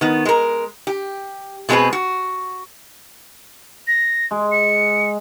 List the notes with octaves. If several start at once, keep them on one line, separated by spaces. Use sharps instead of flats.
D#3 B3
G#3 A#4
G4
B2 G#3 C4 E4 G#4 B4
F#4
A#6
G#3
C#7